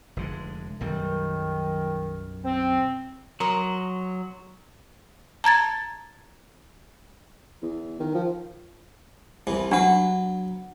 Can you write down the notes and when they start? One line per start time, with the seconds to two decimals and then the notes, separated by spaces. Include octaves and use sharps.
0.17 F1 D3 G#3
0.81 B1 F#2 D#3 G3
2.45 C4
3.40 F#3 A#4 C6 D#6
5.44 A5 A#5 G#6 A6
7.62 E2
8.00 D#3
8.14 F3
9.47 C2 E3
9.71 F#3 D4 B4 F#5